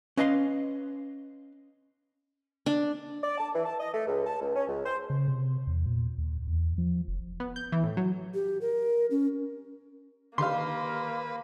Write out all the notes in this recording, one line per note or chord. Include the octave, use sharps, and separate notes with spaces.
C#4 B4 D#5 F5 G5 C6
D4
D5
A5
E3
A5
D#5
A3
C#2
A5
C#2
C#4
C#2
C5
C#3
C3
E2
A#2
D#2
E2
F3
F1
B3
G6
E3
A2
F#3
G4
A#4
C#4
D3 D#3 A#3 G4 B4 F5 C6